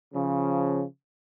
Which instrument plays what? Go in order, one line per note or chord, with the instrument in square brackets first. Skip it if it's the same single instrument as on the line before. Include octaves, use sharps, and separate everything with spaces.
[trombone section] C#3 F3